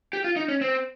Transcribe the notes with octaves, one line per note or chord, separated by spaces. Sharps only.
G4
F4
D#4
C#4
C4